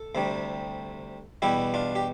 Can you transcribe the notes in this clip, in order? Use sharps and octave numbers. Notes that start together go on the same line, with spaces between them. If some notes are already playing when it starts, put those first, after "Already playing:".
Already playing: A4
D2 C3 G3
E2 B2 G3 E4 G4
D4 F4
G4